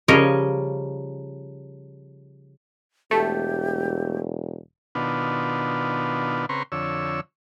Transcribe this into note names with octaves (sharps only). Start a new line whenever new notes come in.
C#3 F3 G3 A#4 C#5 D#5
E1 A3 G4
B2 D#3 B3 D4 F4
C#3 C4 B4 A#5 C6 C#6
F2 D3 C#5 E6